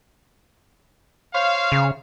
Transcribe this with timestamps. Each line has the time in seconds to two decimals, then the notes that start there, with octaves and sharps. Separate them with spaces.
1.34 C5 C#5 F5
1.72 C#3